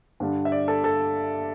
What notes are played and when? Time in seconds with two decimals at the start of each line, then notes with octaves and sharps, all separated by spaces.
0.20 G2 D3 G3 D4
0.45 E5
0.52 D5
0.68 A4
0.84 A4